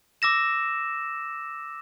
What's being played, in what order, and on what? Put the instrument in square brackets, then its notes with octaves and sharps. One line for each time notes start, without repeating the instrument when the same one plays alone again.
[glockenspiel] D6 E6 A#6 E7